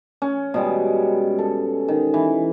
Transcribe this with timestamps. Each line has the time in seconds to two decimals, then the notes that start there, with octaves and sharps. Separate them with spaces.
0.22 C#4
0.54 B2 G3 G#3
1.39 A4
1.88 D#3
2.14 E3